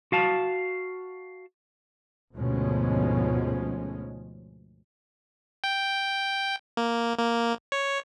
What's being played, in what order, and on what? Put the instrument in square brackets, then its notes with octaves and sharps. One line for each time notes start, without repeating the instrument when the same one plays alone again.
[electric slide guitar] F#4 F5 A5
[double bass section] D2 G#2 B2 F3 G#3 C#4
[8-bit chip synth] G5
A#3
A#3
C#5